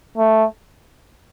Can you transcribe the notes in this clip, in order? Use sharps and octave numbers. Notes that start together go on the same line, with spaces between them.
A3